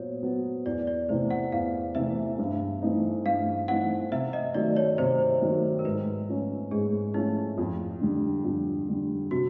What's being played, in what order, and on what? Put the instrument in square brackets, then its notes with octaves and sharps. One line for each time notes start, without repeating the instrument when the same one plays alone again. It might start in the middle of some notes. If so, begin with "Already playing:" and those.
Already playing: [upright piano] A#2 F#3 B3 [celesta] C5 C#5
[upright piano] F#3 B3
[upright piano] E2 [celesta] D5
[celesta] D5
[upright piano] C3 E3 A3 [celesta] C5
[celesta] F#5
[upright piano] E2 [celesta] F5
[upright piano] C3 E3 A3 [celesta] E5
[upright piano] G2
E3 A3 C4 D#4
[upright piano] G2 [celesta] F5
[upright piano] E3 A3 C4 D#4 [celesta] F#5
[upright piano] C3 [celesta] E5
[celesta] D#5
[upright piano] D#3 F#3 A3 [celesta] D5
[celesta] C#5
[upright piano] C3 [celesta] C5
[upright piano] D#3 F#3 A3
[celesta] A#4
[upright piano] G#2 [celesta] B4
[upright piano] F3 A3 C#4
[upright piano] G#2 [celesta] G#4
[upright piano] F3 A3 C#4 [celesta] E4
[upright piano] F2
D3 G3
F2
D3 G3
[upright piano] C3 [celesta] F#4